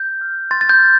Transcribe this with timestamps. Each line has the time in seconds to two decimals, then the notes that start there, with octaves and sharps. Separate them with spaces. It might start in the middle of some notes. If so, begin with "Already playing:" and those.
Already playing: G6
0.21 F6
0.51 C6 A6
0.61 A6
0.69 G6
0.79 F6